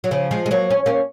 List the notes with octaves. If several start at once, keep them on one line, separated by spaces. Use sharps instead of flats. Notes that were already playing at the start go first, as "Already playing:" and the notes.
F#3
C#3 F3
F3 G#3
G#3
F#3 A#3
C#4
A#3 C#4